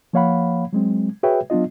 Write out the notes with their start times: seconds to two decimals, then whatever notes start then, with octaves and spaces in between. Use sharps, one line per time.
0.13 F3 A#3 C#5 F5 F#5 B5
0.73 F#3 G#3 C4
1.23 F#4 G#4 B4 C#5 E5 G5
1.50 F#3 B3 D4 F4 D#5